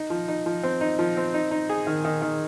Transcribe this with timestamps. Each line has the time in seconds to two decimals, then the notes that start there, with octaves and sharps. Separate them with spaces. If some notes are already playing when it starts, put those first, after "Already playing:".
Already playing: D#4
0.10 F3
0.28 D#4
0.46 F3
0.63 C4
0.81 D#4
0.99 F3
1.17 C4
1.34 D#4
1.51 D#4
1.69 G#4
1.87 D#3
2.05 D#3
2.22 D#3